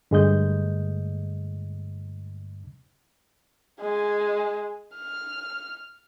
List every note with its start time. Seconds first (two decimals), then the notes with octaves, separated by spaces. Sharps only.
0.11 G2 D3 G#3 A3 D#5 G6
3.80 G#3 G#5
4.95 F6